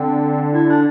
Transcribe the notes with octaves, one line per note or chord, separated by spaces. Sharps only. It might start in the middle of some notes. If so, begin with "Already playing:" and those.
Already playing: D3 C4
E4
D4